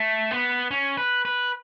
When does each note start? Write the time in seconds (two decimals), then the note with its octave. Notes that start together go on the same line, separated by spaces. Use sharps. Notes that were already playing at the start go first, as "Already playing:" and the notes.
Already playing: A3
0.31 B3
0.71 C#4
0.97 B4
1.25 B4